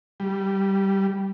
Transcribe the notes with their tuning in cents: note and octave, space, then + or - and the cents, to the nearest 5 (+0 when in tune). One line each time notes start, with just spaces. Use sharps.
G3 -10